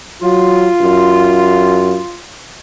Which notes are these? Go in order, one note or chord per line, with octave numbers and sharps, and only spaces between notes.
F#3 F4
F#2